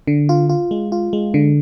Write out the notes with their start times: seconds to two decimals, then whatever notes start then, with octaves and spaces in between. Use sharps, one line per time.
0.07 D3
0.29 F4
0.49 F4
0.71 G#3
0.92 F4
1.13 G#3
1.34 D3